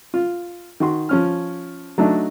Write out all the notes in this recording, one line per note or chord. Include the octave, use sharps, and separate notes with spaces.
F4
D#3 F#4 C6
F3 C#4 F6
F#3 A3 D4 D#4